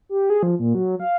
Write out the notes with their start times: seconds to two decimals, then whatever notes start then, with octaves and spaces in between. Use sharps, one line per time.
0.09 G4
0.30 G#4
0.43 F3
0.59 A#2
0.75 F#3
1.00 F5